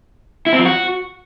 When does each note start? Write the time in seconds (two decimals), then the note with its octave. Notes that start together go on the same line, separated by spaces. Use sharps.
0.47 E4
0.53 C4
0.59 F3
0.65 F#4